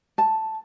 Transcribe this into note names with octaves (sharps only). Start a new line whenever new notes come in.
A5